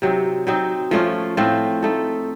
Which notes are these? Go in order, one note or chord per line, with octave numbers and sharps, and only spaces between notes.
C3 F#3 C4 D#4
F#3 C4 D#4
F3 A3 C#4 F4
A2 A3 C4 F4
A3 D#4 A4